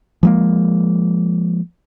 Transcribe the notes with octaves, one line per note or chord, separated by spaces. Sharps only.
F3 G#3 A#3